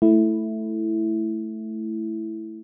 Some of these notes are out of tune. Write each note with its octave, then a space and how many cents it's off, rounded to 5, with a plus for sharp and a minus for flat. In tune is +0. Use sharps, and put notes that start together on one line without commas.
A3 +0 E4 +0